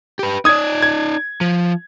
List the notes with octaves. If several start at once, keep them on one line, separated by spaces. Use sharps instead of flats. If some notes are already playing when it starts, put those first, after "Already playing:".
G4 B4
D#4 D5 D#6 G#6
G#6
F3